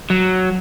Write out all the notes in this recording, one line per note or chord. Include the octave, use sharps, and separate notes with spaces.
F#3